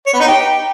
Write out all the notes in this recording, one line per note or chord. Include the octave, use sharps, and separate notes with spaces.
C#5
B3
D#4
G4